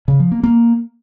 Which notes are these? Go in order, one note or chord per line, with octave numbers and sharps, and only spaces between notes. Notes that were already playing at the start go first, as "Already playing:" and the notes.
C#3
F3
A#3
A#3